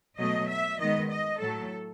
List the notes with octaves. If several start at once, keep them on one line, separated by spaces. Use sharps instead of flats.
B2 F#3 A3 D#5
E5
D#3 G#3 B3 D#5
D#5
A2 F#3 A3 A4